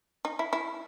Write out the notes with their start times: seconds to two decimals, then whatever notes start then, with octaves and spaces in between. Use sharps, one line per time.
0.25 D#4
0.39 E4
0.53 E4